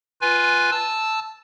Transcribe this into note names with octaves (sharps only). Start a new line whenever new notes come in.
F4 B4 G#5
A5 E6